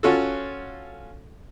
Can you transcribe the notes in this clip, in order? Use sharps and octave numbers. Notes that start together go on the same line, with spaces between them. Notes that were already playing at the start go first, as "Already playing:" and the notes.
C#4 F4 F#4 A4